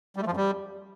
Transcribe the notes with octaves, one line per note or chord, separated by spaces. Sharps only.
G3
A3
F3
F#2
G3